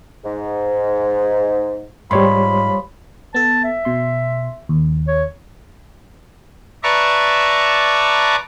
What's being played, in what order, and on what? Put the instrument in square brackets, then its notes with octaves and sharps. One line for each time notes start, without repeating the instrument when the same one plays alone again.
[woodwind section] G#2
[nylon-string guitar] G#2 [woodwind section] F3 B5 [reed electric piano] G3 C#5 C6
[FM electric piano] B3 A4 [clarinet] A5
[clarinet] E5
[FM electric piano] B2 C6
D#2
[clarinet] C#5
[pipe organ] B4 D5 E5 A5 A#5 C#6